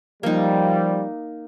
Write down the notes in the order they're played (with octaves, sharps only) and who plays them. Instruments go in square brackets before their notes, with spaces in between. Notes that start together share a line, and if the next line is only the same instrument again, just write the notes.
[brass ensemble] F3 G3 [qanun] A#3 D#4